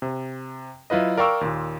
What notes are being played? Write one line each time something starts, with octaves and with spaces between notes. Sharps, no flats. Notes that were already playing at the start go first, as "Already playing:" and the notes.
C3
F#3 E4 F4 B4 D#5
A#4 D5 F5 G5 C#6 E6
D#2 A#2